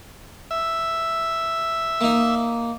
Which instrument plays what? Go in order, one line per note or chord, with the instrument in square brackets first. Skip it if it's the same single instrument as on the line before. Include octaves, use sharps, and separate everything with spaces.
[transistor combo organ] E5
[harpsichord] A#3 D#4